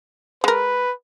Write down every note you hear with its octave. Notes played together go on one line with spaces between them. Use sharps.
G#3 A#4 B4